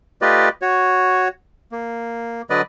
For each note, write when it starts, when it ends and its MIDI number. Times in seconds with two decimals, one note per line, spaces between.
0.22 0.49 57
0.22 0.49 65
0.22 0.49 67
0.22 0.49 71
0.22 0.49 74
0.22 0.49 75
0.62 1.28 66
0.62 1.28 73
1.72 2.42 58
2.50 2.61 50
2.50 2.61 54
2.50 2.61 71
2.50 2.61 74
2.50 2.61 75